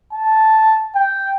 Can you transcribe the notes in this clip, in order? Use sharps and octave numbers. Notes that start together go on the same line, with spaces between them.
A5
G5